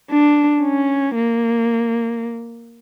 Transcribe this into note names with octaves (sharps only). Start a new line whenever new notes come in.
D4
C#4
A#3